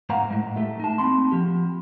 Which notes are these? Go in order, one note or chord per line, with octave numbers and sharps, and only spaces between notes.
G#2 A#3 C5 F5 F#5 A#5
A2 G#3
A3 G4 A4 E5
D#4 A5
A#3 C4 B5 C6
F3 G4